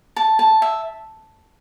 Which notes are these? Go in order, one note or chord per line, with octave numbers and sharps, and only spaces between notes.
A5
A5
E5